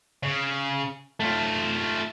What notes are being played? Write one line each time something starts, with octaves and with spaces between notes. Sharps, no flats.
C#3
A3 F4